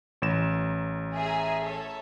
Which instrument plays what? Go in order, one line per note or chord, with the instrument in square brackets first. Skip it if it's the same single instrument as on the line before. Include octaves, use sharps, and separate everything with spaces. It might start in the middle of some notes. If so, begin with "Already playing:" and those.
[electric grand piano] A1 E7
[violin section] G#4 E5 A#5
A4 C#5 E5